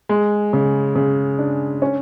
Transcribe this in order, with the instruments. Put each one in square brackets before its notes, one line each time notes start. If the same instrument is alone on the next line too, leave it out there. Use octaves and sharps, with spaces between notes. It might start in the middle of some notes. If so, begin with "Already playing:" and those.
[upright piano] G#3
C#3
C#3
D4
C#4